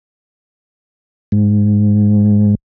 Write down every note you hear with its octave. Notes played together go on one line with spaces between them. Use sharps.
G#2